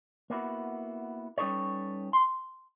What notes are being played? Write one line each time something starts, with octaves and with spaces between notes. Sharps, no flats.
A#3 B3 E4 F#4
G3 C#4 D#4 A4 B4 C#5
C6